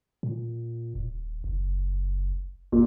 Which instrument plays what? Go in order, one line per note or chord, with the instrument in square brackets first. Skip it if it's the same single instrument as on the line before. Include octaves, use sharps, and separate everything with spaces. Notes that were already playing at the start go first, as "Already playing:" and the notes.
[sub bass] A#2
D#1
F#1
[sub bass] G1 [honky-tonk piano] A#2